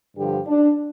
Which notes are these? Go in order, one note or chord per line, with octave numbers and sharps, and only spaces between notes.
G2 D3 F3 G4
D4